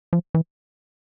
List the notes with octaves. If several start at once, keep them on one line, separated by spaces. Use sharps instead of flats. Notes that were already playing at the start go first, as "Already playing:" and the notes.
F3
E3